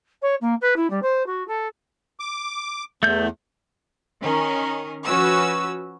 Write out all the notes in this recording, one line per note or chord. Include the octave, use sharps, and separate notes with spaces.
C#5
A#3
B4
E4
G3
C5
F#4
A4
D6
E2 A3 G6
D#3 C#4 A#4
F3 C#4 F#4 B4 E6